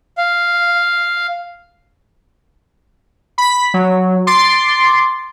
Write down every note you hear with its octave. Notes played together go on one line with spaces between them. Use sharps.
F5
B5 B6
F#3
C6 D6 A6 C7